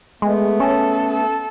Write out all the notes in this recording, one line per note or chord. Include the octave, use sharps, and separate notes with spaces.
G#3 A3 B3
C#4 A4
A4